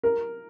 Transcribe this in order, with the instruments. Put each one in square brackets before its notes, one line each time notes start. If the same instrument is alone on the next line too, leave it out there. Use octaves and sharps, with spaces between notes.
[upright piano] A#4